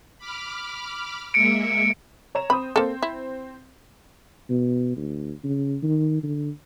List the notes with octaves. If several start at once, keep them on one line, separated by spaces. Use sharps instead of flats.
B5 D6 F6
G#3 A#3 E5 C#7 D7
C#5 A#5 E7
C4 C5 B5 D#6
A#3 C4 A4 C5
E4
B2
D2
C#3
D#3
D3